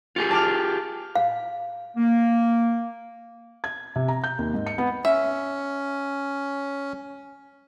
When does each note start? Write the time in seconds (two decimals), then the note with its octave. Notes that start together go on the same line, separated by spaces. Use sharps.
0.16 F4 G4 G#4 C#7
0.31 A5 D6 F6
1.16 F5
1.96 A#3
3.64 G#6
3.96 C3
4.08 A#5
4.24 G6
4.39 D#2
4.54 G#2
4.67 C#7
4.78 B3
5.05 C#4 E5